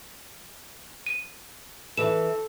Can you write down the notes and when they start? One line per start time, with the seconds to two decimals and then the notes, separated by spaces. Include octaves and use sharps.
1.06 D#7
1.97 E3 A4 B4 E7